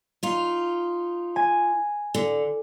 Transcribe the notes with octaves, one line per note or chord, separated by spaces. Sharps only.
D#4 F4
G#5
D3